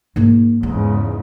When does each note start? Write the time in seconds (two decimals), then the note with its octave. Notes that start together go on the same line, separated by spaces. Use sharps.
0.16 G#2 A#3
0.63 E2 G#2 C#3 C#4